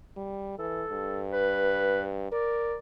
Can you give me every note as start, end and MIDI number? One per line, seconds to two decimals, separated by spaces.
0.17 0.56 55
0.58 0.84 52
0.58 1.24 69
0.89 2.27 43
1.32 2.02 71
2.32 2.77 70
2.32 2.77 74